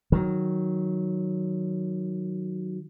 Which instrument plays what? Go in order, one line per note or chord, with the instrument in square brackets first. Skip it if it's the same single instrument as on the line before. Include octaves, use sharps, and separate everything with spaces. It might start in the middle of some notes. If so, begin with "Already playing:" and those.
[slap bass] D#3 F#3